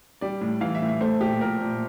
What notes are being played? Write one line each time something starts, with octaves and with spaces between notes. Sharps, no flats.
G3 D5
A2
E3 F5
E5
A2
E5
A3 C5
A#2 G4
F3 A#4
A#2